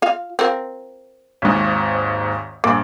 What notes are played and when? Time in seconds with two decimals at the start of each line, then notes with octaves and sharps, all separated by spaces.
0.02 F4 F5
0.39 C4 F4 A#4
1.42 G#1 D#2 G#2
2.64 A#1 G2 A#3 D6